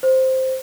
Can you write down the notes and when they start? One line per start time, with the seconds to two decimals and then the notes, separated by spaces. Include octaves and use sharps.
0.03 C5